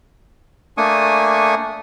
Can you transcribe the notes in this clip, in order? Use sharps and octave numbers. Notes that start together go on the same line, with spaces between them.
A3 A#3 D4 G#5 C#6 D#6